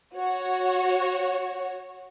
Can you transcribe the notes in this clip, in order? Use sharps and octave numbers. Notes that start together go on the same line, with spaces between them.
F#4 C#5